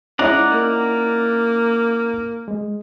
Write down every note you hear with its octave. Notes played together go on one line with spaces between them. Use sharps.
G#3 C#4 D#4 E4 D5 F#5 A#5
A#3
G#3